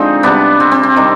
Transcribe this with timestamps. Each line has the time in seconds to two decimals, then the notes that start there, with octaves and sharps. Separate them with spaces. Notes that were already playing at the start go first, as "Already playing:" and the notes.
Already playing: D3 F3 G#3 C4 D#4
0.23 C3 G3 B3 D4
0.60 C4
0.71 C4
0.83 C4
0.96 C3 D#3 G3